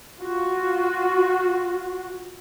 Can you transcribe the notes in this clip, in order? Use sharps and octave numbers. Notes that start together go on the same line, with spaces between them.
F4 F#4